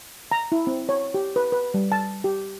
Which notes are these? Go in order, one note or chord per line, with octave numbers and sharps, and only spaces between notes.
A#5
E4
C4
C#5
G4
B4
B4
G3
A5
G4